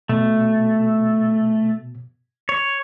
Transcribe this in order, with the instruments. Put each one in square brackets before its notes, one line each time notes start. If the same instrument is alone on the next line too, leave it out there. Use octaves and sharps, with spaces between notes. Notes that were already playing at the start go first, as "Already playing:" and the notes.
[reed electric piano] B2 [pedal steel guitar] A3
[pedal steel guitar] C#5